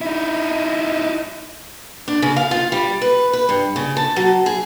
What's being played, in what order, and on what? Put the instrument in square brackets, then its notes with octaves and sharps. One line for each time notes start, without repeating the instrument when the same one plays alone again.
[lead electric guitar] D#4 E4
[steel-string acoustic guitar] D4
C#3
F5
F4
G3
B4
B4
G2
C#3
A5
F#3
G#4